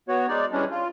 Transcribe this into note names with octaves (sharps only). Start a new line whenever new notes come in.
B3 F#4 C#5
G#3 D#4 D5
E3 G3 G#3 C#4 D4
F4